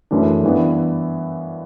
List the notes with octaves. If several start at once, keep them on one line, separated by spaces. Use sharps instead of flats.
F#2 E3 A3 D4
G2 E3 B3